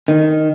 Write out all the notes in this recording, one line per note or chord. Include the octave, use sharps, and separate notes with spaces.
D#3